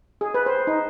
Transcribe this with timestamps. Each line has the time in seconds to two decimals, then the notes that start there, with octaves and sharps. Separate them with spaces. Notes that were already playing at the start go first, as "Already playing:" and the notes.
0.21 G#4
0.34 B4
0.46 C5
0.67 D#4